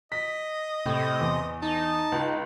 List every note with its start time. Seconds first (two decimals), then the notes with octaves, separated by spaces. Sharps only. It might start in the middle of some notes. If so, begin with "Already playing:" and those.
0.12 D#5 B6
0.86 A2 C3
1.20 E2
1.62 D#4 A5
2.12 C#2